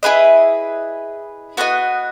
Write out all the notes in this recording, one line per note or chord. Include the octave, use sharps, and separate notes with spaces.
E4 G#4 B4 D#5
B3 F#4 A4 D#5